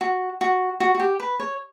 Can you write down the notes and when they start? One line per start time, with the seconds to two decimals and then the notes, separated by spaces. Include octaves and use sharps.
0.01 F#4
0.41 F#4
0.80 F#4
0.95 F#4
1.00 G4
1.20 B4
1.40 C#5